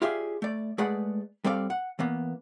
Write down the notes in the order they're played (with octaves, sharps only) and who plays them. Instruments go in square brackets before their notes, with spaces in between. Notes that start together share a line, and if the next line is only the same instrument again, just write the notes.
[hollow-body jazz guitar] F4 G4 G#4 D5 E5 F5
A3 D5
G#3 A3 G#4 B4 D5 F#5
G3 C4 A4 D5 F5
F#5
E3 A#3 B3